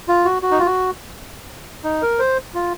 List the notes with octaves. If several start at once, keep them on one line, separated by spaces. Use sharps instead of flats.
F4
F#4
F#4
D#4
F4
F#4
D#4
A#4
C5
F4